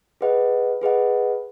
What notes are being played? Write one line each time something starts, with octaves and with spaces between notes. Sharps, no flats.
G#4 B4 D#5 F#5
G#4 B4 D#5 F#5